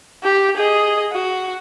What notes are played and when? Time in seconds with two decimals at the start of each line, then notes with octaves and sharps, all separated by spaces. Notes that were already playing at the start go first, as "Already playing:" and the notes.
0.23 G4
0.56 G#4 D#5
1.12 F#4